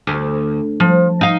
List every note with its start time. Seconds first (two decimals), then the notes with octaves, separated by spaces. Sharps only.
0.07 D2
0.80 F3
1.21 D#4 F5